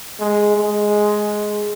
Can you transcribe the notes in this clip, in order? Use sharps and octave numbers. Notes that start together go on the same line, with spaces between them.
G#3
G#3